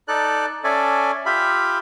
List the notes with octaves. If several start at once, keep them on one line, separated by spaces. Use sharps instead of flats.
D#4 A4 D5 F#6
C#4 A4 D5 E5 G#5
F4 G4 E5 B5